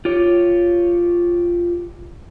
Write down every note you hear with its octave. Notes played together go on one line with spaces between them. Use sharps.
F4 G4 C#5